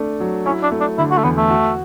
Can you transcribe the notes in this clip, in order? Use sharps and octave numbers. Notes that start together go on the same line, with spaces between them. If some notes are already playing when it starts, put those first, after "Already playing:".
Already playing: A3 D4
F#3
C#4 E4
D4
A3
D4
D3 E4
F#4
A3
E2 B3
A3
F#4